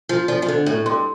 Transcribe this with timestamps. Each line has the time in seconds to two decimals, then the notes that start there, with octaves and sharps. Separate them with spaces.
0.09 F3 F4
0.28 F3 D5
0.42 F3
0.48 D3 A4
0.66 A2 A4
0.86 G2 C6